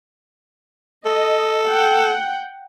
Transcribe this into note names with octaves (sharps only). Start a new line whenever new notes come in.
A4 D#5
F#5 G5